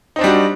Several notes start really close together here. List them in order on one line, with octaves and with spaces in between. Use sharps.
D#4 C4 D4 G3 F#4